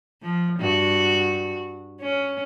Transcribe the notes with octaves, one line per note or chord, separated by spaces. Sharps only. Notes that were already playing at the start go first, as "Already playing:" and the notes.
F3
G2 F#4
C#4